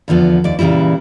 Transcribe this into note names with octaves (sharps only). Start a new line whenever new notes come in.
E2 D3 F3 B3
D#2 D5
A#2 C#3 E3 G3 E4